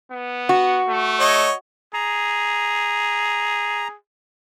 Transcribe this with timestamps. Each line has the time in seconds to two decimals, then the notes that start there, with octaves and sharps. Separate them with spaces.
0.12 B3
0.49 F#4
0.88 A3
1.20 C#5 D#5
1.94 G#4 A#5